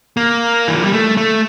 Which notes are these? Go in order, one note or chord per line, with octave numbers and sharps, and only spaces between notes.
A#3
E3
F3
G3
A3
A3